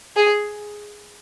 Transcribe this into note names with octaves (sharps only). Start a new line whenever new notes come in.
G#4